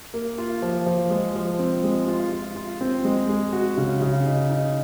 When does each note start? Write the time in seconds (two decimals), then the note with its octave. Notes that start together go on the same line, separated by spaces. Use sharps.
0.14 A#3
0.38 F4
0.62 F3
0.86 F3
1.10 G#3
1.35 F3
1.59 C4
1.84 G#3
2.08 F4
2.32 F4
2.56 F4
2.81 C4
3.05 G#3
3.29 G#3
3.53 F#4
3.78 C#3
4.01 C#3
4.26 D#4
4.50 D#4